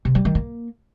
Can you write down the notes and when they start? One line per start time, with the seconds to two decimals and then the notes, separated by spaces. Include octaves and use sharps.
0.05 C3
0.15 G3
0.25 D#3
0.35 A#3